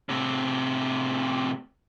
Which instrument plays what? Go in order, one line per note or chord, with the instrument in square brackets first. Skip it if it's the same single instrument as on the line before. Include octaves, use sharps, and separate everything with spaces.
[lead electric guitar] A2 C3